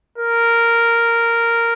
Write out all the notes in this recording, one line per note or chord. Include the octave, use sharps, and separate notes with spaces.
A#4